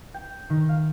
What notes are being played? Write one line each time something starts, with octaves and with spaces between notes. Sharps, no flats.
G5
D#3
F5